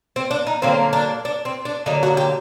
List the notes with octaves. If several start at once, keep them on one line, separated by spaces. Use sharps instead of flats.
C4
D4
D#4
D3 F#3 A#3 C4
D4
D4
C4
D4
D3 F#3 A#3 D#4
F#4
G4